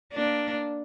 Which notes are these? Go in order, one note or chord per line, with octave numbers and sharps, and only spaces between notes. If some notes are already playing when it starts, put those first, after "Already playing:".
A#3 D4